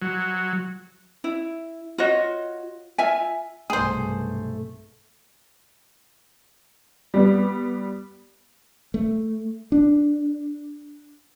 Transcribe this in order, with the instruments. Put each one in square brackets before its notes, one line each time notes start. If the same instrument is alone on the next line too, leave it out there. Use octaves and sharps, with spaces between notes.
[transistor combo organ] F#3
[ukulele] E4
F4 F#4 C#5 D#5
F4 E5 G#5
[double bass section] B1 G2 C3 [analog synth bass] A3 [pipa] G#4 C5
[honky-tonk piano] G3 B3
[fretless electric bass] A3
D4